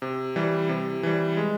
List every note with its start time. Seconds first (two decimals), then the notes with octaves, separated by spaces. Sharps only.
0.02 C3
0.36 E3 G3
0.69 C3
1.03 E3 G3
1.37 G#3